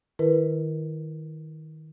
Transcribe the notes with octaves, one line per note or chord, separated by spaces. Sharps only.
D#3 E4 A#4 B4